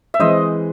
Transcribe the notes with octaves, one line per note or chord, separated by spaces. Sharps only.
E5
E3 G#3 C4 C5 D#5